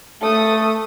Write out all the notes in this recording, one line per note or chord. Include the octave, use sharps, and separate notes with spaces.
A3 A4 D#6